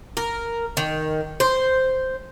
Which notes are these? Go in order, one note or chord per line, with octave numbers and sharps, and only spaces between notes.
A#4
D#3
C5